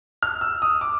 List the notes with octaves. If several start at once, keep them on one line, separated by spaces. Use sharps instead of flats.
F6
E6
D#6
D6